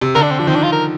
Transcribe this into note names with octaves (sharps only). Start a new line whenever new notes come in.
C3
D3 A#4
D4
C4
F3 D4
D#3 C4
D4
F4
A#4